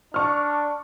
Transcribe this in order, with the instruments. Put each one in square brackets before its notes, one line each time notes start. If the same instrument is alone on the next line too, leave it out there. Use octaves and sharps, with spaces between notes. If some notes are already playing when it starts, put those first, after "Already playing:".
[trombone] D4 [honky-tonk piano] C#6 F6